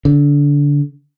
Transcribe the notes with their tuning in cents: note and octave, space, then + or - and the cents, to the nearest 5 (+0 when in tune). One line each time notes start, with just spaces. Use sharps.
D3 -25